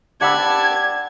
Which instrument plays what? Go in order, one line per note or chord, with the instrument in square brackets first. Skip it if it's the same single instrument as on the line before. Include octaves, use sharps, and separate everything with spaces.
[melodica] G4 D5 A5 [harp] F#5 B5 E6 [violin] G#6